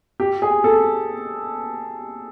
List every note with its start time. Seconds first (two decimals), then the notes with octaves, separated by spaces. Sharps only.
0.20 G4
0.42 G#4
0.64 A4